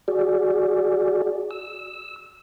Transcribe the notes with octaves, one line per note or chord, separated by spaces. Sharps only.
F#4 G#4 D5
E6